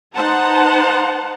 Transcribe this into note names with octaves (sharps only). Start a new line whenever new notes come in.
D#4 B4 C5 F#5 A5 A#5